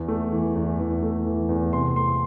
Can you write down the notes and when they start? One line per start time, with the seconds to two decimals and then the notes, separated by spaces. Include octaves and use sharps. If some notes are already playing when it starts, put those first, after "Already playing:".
Already playing: E2
0.08 A3
0.32 E3
0.56 E2
0.80 E2
1.02 A3
1.26 E3
1.49 E2
1.73 C3 C6
1.96 A3 C6